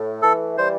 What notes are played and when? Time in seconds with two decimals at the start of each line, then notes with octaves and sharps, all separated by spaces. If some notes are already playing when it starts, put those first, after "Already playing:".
Already playing: A2 A3
0.22 E3 A4
0.58 G3 C5